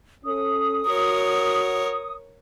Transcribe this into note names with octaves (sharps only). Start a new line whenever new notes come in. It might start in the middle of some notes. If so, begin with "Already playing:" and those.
C#4 A4 D#6
F#4 A#4 C#5